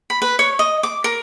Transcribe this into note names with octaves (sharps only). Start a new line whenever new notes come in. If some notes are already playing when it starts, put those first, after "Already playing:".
B5
B4
C#5
D#5
D6
A#4